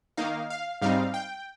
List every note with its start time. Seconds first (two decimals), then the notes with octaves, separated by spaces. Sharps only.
0.17 D#3 A#3 D#4 F5
0.50 F5
0.81 G#2 G3 C4 D#4 F5
1.14 G5